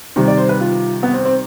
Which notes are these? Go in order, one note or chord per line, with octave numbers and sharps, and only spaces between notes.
C3 D#3 G3 C5
D5
C5
B4
F4
B3
C4
C4